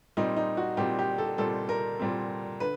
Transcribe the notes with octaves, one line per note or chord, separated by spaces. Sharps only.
A#2 G3 C4 D#4
D#4
F#4
A#2 G3 C4 G4
G4
A4
A#2 G3 C4 A4
A#4
A#2 G3 C4
D3 B4